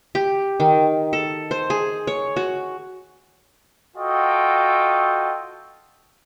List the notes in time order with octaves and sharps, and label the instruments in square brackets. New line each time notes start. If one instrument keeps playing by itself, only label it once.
[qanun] G4
D#3
A4
C5
G#4
C#5
F#4
[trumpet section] F4 F#4 A4 D#5 G5